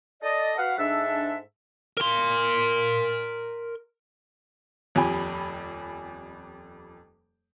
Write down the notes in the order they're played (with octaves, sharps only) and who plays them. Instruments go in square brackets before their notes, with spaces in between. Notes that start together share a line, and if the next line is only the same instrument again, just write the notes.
[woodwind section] A4 D5 D#5
F#4 B4 F5 F#5
G#2 D4 A4 E5
[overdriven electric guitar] A#4 C6
[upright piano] D#1 F2 G4 G#5 B5